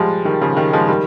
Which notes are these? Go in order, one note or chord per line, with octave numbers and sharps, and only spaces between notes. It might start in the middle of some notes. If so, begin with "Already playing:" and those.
Already playing: F3 G3 G#3
D#3 G3
C#3 F3
D#3 G3
F3 G#3
D#3 G3